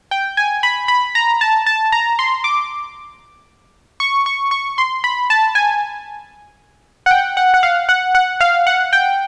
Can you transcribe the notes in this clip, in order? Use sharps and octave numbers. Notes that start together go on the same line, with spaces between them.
G5
G#5
B5
B5
A#5
A5
A5
A#5
C6
D6
C#6
C#6
C#6
C6
B5
A5
G#5
F#5
G5
F#5
F#5
F5
F#5
F#5
F5
F#5
G5